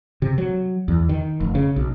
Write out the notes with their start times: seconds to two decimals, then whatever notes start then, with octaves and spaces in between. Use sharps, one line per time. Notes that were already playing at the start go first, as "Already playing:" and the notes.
0.22 C3
0.38 F#3
0.88 E2
1.09 D#3
1.40 F1
1.55 C#3
1.76 B1